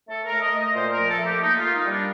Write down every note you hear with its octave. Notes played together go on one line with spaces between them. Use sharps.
A3 A4
A#4
A3
D#5
A3 D#5
A#2 C5
A#4
F3
A4
A3
G4
A#3 D#4
F4
A#3
D#4
G3
D4